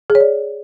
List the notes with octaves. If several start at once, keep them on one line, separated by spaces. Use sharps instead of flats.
G#4
C#5
D5